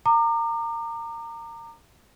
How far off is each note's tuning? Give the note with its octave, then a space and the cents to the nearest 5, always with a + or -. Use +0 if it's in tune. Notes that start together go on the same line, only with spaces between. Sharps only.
A#5 -20 D6 +35